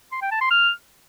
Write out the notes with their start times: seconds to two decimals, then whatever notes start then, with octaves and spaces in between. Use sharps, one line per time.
0.12 C6
0.22 G5
0.31 A5
0.41 C6
0.51 F6